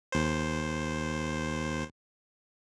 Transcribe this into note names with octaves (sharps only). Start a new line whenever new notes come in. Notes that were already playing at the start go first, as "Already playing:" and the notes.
D#2 C5